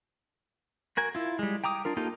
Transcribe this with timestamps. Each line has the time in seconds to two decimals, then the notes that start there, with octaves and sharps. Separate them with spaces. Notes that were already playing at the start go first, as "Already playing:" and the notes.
0.97 F#4 A#4 G#5
1.15 E4 F4
1.39 G3 G#3
1.64 G5 A#5 D6 D#6
1.85 D4 F4 A#4
1.97 A#3 D#4 F4 G4 A4